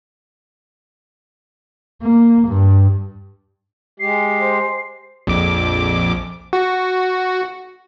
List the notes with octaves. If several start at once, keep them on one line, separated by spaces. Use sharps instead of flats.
A#3
G2
G#3 G4 C7
C5
A#1 F2 D6
F#4